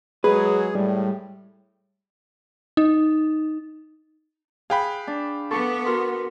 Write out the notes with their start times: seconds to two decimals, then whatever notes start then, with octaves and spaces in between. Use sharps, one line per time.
0.24 F#3 G#3 G#4 B4
0.75 A2 G3
2.77 D#4
4.70 G#4 F5 G5 B5 F#6
5.07 D4
5.51 B3 A4 C#6 D6
5.85 F#4 A#4 C6